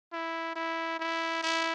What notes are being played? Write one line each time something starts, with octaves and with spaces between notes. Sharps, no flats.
E4
E4
E4
E4